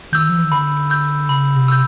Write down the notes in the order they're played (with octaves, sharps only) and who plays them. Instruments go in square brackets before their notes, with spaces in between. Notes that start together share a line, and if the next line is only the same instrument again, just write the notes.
[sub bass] D#3 [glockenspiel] E6 G6
[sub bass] F3
E3
D#3
[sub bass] D3 [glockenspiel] B5
[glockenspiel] E6 G6
[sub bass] C#3 [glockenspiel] B5
[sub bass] C3
[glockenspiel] E6 G6